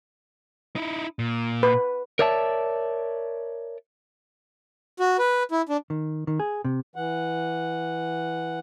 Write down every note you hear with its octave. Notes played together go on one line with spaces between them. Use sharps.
D#4 E4
A#2
B4
A#4 C#5 D5 E5 A5
F#4
B4
E4
D4
D#3
D#3
G#4
C3
E3 F#5